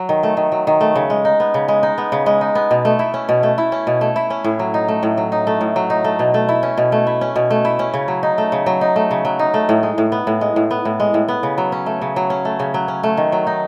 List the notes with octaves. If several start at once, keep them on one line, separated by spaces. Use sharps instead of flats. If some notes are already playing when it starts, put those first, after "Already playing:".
Already playing: F#3
D#3
A3
D#3
F#3
D#3
A3
C#3
G#3
D#4
B3
C#3
G#3
D#4
B3
C#3
G#3
D#4
B3
B2
A3
E4
C#4
B2
A3
E4
C#4
B2
A3
E4
C#4
A2
F#3
D#4
A3
A2
F#3
D#4
A3
A2
F#3
D#4
A3
B2
A3
E4
C#4
B2
A3
E4
C#4
B2
A3
E4
C#4
C#3
F#3
D#4
A3
C#3
F#3
D#4
A3
C#3
F#3
D#4
A3
A2
G#3
A2
B3
A2
G#3
A2
B3
A2
G#3
A2
B3
C#3
F#3
C#4
A3
C#3
F#3
C#4
A3
C#3
F#3
C#4
A3
D#3
F#3
D#4